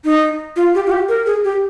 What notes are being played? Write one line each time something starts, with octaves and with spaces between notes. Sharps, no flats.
D#4
F4
G4
F4
G4
A#4
G#4
G4